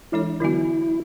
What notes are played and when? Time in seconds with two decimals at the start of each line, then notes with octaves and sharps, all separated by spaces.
0.12 E3 G#3 D4 E4 A4 C#5
0.40 D3 F#3 B3 E4 F#4